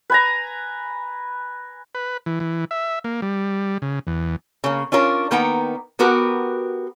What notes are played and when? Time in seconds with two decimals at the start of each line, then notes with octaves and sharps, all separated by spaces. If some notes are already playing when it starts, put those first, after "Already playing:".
0.10 B4 G#5 A#5
1.95 B4
2.26 E3
2.40 E3
2.71 E5
3.04 A#3
3.22 G3
3.82 C#3
4.07 E2
4.64 C#3 A#3
4.92 C#4 D4 F4 A#4
5.31 D#3 A#3 B3 D#4 G5 A#5
5.99 B3 F#4 G4 A#4 B4